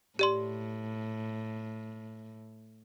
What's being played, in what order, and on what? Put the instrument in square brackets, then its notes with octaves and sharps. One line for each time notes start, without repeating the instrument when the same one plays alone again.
[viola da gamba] A2 [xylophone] G4 D5 C6